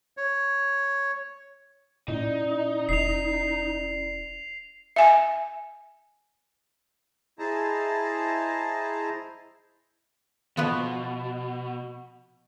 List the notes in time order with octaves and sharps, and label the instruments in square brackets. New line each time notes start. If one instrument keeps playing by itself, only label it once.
[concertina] C#5
[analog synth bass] A#2 [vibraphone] C#4 E4 D5 [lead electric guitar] D#4
[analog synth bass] F1 [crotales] C7 F7
[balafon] E5 G#5
[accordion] E4 G#4 C5 D#5 A5 A#5
[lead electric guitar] B2 [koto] F3 B3 B4